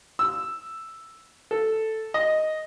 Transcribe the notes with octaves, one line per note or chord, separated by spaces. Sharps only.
E6
A4
D#5